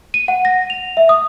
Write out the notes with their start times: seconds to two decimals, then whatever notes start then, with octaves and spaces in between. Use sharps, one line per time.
0.14 D#7
0.28 F#5
0.45 A#6
0.70 F7
0.97 E5
1.09 D#6